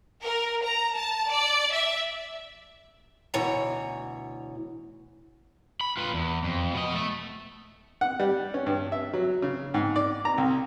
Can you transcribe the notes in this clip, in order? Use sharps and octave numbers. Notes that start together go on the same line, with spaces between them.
A#4
A#5
A5
D5
E5
D2 B2 E3 C#5 A#5
B5
F4 B4
E2
F2
B2 D#5
A3 A4
F#5
G3
C#4
G2
E5
F#3
C#3
G#2
D5
A#5
C2